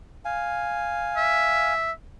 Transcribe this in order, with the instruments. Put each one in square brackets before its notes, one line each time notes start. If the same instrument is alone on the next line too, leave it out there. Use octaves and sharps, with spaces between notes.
[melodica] F5 G#5
[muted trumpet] E5